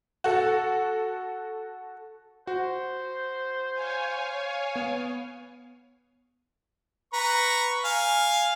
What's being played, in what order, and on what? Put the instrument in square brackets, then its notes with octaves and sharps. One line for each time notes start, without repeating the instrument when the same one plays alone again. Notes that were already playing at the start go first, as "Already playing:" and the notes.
[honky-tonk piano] F#4 A4
[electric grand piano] F#4 [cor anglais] C5
[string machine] C#5 F5 G#5
[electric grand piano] B3
[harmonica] B4 A#5 C#6
F5 G#5